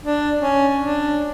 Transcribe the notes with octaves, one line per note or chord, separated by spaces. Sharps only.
D4
C#4
D4